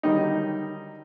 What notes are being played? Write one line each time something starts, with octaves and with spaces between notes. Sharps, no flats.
D3 D#3 F#3 G3 D#4